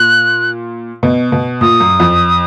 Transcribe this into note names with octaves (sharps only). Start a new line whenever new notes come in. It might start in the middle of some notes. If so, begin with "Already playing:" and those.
Already playing: A#2 F#6
B2
B2
A#2 D#6
F#2
F2